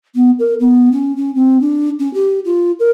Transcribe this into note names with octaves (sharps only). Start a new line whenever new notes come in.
B3
A#4
B3
C#4
C#4
C4
D4
C#4
G4
F4
A#4